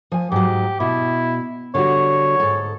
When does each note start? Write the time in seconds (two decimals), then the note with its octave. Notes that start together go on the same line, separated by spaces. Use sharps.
0.12 F3 G#5
0.32 G#2 F#3 G4
0.80 B2 E4
1.74 D3 G3 F#4 C#5
2.40 G#2 A4